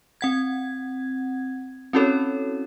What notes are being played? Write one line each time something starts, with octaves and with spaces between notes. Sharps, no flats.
C4 F#5 G#6
C4 C#4 E4 F#4 A4 C#5